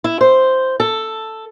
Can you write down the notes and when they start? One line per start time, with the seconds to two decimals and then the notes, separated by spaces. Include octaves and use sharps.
0.04 E4
0.21 C5
0.80 A4